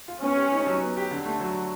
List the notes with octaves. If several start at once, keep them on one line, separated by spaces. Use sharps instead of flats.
F4
B3 C#4
G4
D#4
F#3
B3
G4
D3
A3
F#3